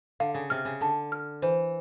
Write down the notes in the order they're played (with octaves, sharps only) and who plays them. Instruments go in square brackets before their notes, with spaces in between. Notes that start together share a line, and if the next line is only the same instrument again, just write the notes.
[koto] D3 [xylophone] F5
[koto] C#3
[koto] C3 [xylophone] F6
[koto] C#3
[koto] D3 [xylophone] A5
[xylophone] F6
[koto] E3 [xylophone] C5